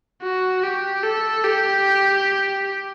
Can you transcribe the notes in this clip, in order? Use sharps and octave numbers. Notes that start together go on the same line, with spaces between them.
F#4
G4
A4
G4